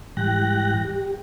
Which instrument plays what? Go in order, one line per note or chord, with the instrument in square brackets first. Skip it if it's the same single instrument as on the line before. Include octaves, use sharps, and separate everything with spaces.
[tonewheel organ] G#2 E3 G3 G5 F#6 A#6
G4